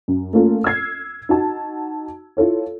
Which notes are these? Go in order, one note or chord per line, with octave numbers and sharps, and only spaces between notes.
F#2
A3 A#3 C#4 F4 A4
E6 F6 G#6 C7
D#4 F#4 A5
E4 F4 A4 C#5